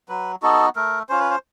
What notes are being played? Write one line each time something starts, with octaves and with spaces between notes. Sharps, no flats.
F#3 B4
B3 D#4 F#4 A4
A3 A#4
C#4 F4 C5
B4
C5